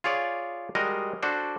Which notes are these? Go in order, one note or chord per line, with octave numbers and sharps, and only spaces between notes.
F4 G#4 C#5 D5
G3 G#3 F#4 A#4 D#5
D4 F#4 A4 C5 D5